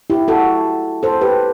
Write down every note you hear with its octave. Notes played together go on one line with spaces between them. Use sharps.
E4 G4
F#4 A4
A4 C5
G4 B4